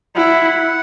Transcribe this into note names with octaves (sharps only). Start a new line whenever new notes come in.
E4 F#5